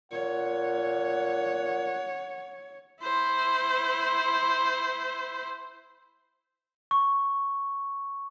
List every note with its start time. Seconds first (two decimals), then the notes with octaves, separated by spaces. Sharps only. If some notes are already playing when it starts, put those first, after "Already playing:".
0.12 A#2 C#5 F#5
3.01 E4 C5
6.91 C#6